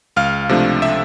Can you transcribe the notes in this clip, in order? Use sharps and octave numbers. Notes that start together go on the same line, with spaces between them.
C#2 F5 F6
C3 F3 A3 D4
E5 E6